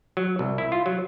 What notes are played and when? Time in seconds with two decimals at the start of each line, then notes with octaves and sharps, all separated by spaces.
0.17 F#3
0.39 C2
0.58 E4
0.72 F4
0.86 F#3